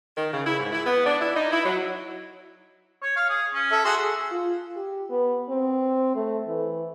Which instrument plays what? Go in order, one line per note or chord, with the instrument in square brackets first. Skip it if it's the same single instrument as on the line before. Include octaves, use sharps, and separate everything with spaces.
[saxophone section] D#3
C#3
E4
G#2
E4
B3
D4
E4
D#4
E4
F#3
[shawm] C#5
F5
G#4
C#4
[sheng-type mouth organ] A4 E5
[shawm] F#4 [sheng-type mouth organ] G#4 C6 E6
[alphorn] F4
G4
B3
C4
A3
E3